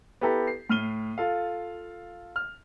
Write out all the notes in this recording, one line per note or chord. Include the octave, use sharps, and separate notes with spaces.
B3 E4 G4 A4 A#5
C7
A2 F6 D#7 G7
F4 A4 F5
F6